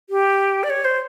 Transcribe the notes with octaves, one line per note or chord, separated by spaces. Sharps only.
G4
D5
C#5
C5